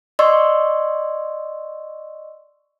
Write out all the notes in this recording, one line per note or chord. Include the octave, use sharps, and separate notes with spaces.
D5 D#5 C6 C#6 E6